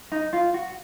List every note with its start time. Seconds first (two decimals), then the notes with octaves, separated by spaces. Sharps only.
0.12 D#4
0.33 F4
0.54 F#4